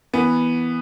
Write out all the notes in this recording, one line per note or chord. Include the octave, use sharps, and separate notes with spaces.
E3 B3